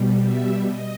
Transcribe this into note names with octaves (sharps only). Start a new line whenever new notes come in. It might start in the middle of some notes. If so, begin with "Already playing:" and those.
Already playing: B2 G3
E5
D#5